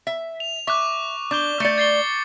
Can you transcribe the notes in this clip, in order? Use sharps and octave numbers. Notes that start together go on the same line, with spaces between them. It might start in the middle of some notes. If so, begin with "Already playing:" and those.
E5
F7
E5 C#6 D6 F#6
D4 D6 G6 G7
A3 D5 C#6 C#7
A6 C7 G7